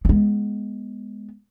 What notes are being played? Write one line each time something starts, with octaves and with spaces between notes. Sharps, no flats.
G#3 B3